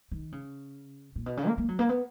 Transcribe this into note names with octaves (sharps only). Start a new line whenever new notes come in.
D#3
C#3
A#2
B2
C#3
A#3
A#3
F#3
A#3
B3